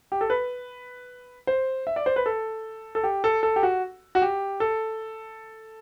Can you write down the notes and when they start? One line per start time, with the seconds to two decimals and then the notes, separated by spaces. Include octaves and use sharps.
0.12 G4
0.21 A4
0.30 B4
1.47 C5
1.87 E5
1.96 D5
2.06 C5
2.16 B4
2.26 A4
2.95 A4
3.03 G4
3.24 A4
3.43 A4
3.56 G4
3.63 F#4
4.15 F#4
4.22 G4
4.60 A4